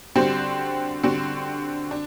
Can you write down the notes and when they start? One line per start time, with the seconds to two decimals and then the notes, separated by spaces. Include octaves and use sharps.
0.15 D3 G3 C4 F#4 C5
1.03 D3 G3 C4 F#4 C5
1.91 D4